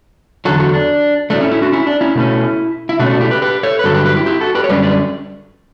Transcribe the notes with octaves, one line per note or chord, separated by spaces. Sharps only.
E2 D3 F#3 F#4 A4
F#4 A4
D4
A2 F#3 A3 D4
C#4 E4
C#4 E4
D4 F#4
C#4 E4
D4
C#4 E4
B2 A3 C#4
E4
B2 A3 C#4 D4 F#4
D4 F#4
E4 G4
G4 B4
G4 B4
A4 C#5
B4
G2 D3 F#3 F#4 A4
G4 B4
G4 B4
E4 G4
E4 G4
F#4 A4
G4 B4
C#5
F#2 D3 G3 C#4 B4 D5
B4 D5